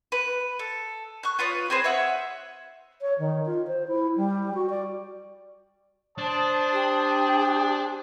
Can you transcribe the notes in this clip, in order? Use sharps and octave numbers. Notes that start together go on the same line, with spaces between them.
B4
A4
C#6 F#6
F4 B4 C#5 D#6
C4 G#4 B4 C5
C#5 E5 F#5
C#5
D#3
F4
C5
E4
G3
F#4
D5
D4 C5 A5 D#6
G4